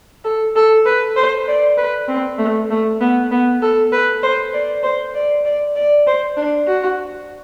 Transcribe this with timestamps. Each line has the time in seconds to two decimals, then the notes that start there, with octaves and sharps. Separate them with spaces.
0.24 A4
0.56 A4
0.86 B4
1.17 C5
1.48 D5
1.78 B4
2.08 C4
2.39 A3
2.70 A3
3.01 B3
3.31 B3
3.62 A4
3.92 B4
4.23 C5
4.54 D5
4.83 C5
5.14 D5
5.45 D5
5.76 D5
6.07 C5
6.37 D4
6.67 F#4